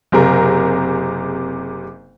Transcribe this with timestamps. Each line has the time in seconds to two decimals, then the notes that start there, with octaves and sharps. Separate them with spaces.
0.12 F#1 C3 G#4 A#4